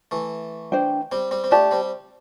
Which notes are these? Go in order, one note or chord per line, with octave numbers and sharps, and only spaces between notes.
E3 A3
D4 C5 G5
G3 C4
G3 C4
C4
A3 D4 G4 D5 A5
G3 C4